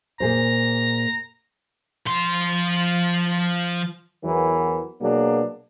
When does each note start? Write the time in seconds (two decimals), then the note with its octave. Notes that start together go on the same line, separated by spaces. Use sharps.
0.20 A#2 G#4 C5 A#5
2.07 F3 C6
4.24 E2 E3 F#3 B3 A#4
5.01 B2 F#3 A#3 D4 G#4